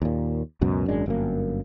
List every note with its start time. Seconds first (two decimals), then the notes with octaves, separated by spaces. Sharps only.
0.02 D#2 A#2
0.61 C#2 F#2 B2
0.88 G#1 F#2 G#3 D4
1.06 G1 F#2 A#3